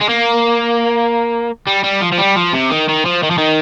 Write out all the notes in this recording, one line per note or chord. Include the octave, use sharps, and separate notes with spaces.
G#3
A#3
G3
G3
F3
F3
G3
F3
C3
D#3
D#3
F3
D#3
F3
D#3